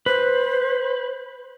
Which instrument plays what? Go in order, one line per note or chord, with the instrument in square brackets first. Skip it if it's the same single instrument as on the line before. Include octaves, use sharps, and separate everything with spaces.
[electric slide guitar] B4 [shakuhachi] C5